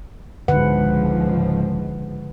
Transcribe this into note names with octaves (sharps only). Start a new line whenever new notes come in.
C#2 G#2 D3 F3 B4 F#5